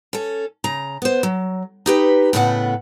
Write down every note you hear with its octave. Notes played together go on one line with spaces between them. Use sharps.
C#4 A4
C#3 A#5
B3 C5
F#3
D#4 G4 B4
A2 C#3 A3 B3 B4 F#5